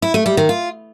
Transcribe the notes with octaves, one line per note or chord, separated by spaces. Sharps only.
E4
A3
G3
D#3
F4